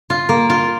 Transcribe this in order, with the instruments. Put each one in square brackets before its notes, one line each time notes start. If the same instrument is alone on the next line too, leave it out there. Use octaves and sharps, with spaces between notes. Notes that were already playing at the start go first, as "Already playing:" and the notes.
[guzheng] F4
A#3
F4